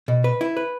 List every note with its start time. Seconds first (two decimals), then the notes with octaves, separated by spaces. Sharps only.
0.08 B2
0.24 B4
0.41 E4
0.57 B4